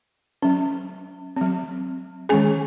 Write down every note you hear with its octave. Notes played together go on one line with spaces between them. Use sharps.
F#3 C#4
F#3 C4
D#3 G#3 C#4 G#4 G#5